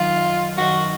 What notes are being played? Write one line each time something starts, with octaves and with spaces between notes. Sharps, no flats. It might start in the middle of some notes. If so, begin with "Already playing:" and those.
Already playing: F#2 D#3 F#3 F4
F#2 D#3 F#3 F#4